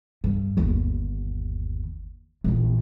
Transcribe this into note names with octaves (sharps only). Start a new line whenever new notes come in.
G2
G1 D#2
A#1 E2